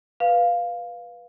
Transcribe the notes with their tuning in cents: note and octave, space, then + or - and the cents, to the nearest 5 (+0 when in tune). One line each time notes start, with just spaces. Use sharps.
B4 -10 F5 +0